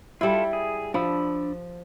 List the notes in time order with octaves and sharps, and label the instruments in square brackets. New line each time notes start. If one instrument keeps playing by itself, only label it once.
[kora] G3 E4 [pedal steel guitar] F4 A4
[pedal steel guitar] G#4
[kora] F3 [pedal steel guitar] D4 B5 E6